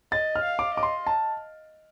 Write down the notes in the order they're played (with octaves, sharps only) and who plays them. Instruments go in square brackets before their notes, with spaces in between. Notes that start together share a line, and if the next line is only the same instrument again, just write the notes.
[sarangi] D#5 [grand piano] A6
[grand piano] F6
[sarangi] F5
[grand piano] D6
[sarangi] D#5 [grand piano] D6
[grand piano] C6
A5